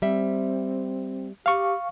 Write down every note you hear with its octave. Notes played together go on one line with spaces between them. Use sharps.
G3 C4 E5
G4 F5 C#6